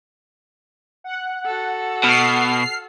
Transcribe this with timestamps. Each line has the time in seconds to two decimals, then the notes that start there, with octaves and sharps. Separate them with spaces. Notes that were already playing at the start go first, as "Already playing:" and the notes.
1.04 F#5
1.45 F#4 A4
2.04 B2 F6 C7